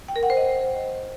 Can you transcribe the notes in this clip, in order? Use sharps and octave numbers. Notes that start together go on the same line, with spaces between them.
G5
A#4
F#5
C5
D#5